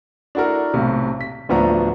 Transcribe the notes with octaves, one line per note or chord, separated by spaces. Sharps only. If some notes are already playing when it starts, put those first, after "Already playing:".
D4 E4 F#4 A4 A#4
B1 A2 C3
B6
D1 D2 F3 B3 D5 A#5